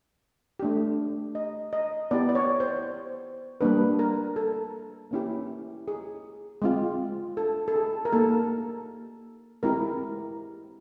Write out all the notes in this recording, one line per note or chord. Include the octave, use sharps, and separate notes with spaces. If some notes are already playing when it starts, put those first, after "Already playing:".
A3 D4 G4
D#5
D#5
B3 E4 G4 D5
D5
C#5
C5
G3 A#3 D4 B4
A#4
A4
A#3 C#4 E4 G4
G#4
G#3 C4 F4
A4
A4
G#4
A#4
A#3 D#4 G4 A4
G#3 C4 E4 G4 A#4